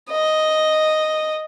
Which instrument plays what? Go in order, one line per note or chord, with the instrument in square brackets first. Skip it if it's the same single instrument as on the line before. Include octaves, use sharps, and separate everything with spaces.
[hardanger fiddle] D#5